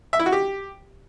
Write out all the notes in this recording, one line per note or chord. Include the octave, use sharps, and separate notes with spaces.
E5
E4
F#4
G4